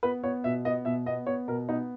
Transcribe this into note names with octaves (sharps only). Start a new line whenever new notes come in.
B3 B4
B3 C#5
B2 E5
B3 D#5
B2 E5
B3 D#5
B3 C#5
B2 A#4
B3 D#4